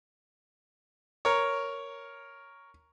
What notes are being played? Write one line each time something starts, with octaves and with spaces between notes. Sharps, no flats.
A#4 C#5